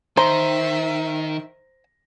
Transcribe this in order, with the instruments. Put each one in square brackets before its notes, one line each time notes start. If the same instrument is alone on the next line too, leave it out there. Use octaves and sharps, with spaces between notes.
[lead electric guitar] D#3 [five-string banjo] C5 [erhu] E5 [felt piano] A#5